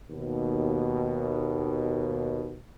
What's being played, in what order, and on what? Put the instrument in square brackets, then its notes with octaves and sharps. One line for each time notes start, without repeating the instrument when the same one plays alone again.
[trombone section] D#2 B2